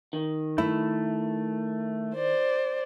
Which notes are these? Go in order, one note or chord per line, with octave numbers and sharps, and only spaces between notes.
D#3
A3 E4
C5 D5